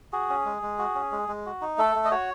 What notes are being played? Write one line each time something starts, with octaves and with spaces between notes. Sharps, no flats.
F#4 G#4
C#4
G#3
G#3
F#4
C#4
G#3
G#3
F#4
D#4
A3 A4
A3
D#5
F#4 C#5